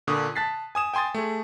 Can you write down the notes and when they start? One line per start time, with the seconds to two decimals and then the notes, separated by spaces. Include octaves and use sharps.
0.07 A#2 D3 C#6 D#6
0.36 A5 F#6 A6 B6 C7
0.75 G#5 D#6 E7
0.94 G5 G#5 C6 D#6 A6
1.14 A3 G#4